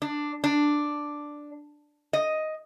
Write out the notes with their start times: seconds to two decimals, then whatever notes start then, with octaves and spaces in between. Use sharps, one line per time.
0.02 D4
0.44 D4
2.13 D#5